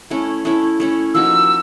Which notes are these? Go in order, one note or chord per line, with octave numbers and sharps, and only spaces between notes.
A3 C#4 E4
A3 C#4 E4
A3 C#4 E4
F3 A#3 D#4 F#4 E6